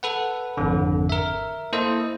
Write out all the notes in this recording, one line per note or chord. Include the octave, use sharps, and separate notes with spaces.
A4 B4 F#5
G#1 F2 D3
A#4 E5
A#3 E4 A4 C5 D#5